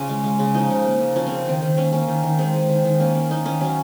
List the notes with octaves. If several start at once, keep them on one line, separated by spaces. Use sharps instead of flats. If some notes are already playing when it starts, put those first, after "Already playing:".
Already playing: C#3 C#4 F4
G#3
G#3
C#3
F3 D#4
C#3
A#3
C#3
F3 C#4
C#3 C4
D#3 C4
D#3
A#3 C#4
A#3 C#4
D#3
D#3
G#3 C4
G#3
D#3
D#3
A#3 C#4
A#3
A#3 D#4
D#3 C#4
F#3 C#4